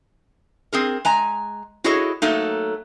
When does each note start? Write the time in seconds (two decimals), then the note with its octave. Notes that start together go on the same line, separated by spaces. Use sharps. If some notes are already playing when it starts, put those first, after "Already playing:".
0.73 C4 G#4 A#4
1.05 G#3 G#5 A#5
1.84 E4 F#4 G#4 A4 C#5 D#5
2.22 F#3 A3 A#3 D#4